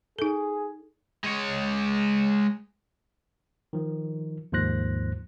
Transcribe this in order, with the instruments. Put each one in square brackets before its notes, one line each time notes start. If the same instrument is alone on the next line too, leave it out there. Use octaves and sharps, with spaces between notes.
[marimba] D#4 A4 [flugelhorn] G#4
[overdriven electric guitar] G#3 C#5
[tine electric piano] D#3 F3
D#2 G#2 F3 C5 F#6 A#6